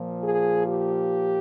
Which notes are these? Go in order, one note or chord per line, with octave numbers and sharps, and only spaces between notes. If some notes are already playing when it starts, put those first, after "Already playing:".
Already playing: A#2 F3
G#4
G4